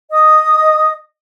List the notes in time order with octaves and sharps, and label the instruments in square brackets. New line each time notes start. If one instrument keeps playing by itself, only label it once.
[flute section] D#5 D#6